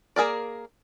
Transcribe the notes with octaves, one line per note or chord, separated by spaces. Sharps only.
A#3 G#4 A#4 D5